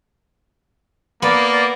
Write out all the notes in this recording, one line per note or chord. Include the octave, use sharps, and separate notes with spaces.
A#3 B3 D5